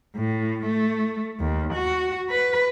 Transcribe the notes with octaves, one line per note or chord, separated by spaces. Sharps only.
A2
A3
D#2
F#4
B4